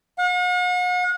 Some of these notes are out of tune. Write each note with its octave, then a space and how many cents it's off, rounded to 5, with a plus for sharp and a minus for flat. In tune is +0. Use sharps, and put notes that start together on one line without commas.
F#5 -45